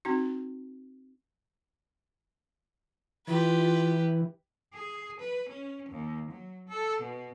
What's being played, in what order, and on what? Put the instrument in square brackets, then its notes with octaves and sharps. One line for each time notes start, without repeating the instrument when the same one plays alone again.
[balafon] C4 D#4 F#4
[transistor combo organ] E3 [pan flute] F4 [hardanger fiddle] G4 B4
[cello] G#4
B4
C#4
D#2
F#3
A4
B2